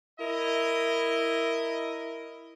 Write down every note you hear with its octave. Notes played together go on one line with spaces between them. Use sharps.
E4 A#4 D#5